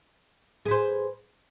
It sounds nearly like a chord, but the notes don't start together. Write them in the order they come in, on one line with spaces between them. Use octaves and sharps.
G#4 B4 C5